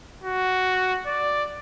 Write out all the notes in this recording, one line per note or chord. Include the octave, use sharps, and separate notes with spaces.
F#4
D5